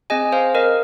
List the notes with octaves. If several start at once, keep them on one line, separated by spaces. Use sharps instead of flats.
C4 G#4 D#5 G#5
C5 F5
A#4 D#5